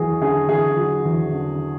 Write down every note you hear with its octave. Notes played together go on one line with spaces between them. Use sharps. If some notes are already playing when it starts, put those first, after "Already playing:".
Already playing: E2 F#3 F#4 G#4
D3 G#4
E2 G#4
F#3
E2
D3